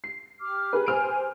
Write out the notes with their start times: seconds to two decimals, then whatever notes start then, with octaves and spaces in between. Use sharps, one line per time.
0.04 C7
0.41 G4 D6 F6
0.73 G#4 A#4 B4
0.86 G4 C5 G#5 F6 D7